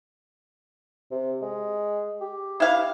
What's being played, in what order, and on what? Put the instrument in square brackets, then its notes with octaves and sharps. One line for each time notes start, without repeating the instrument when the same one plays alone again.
[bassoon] C3
G#3
G4
[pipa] E4 F5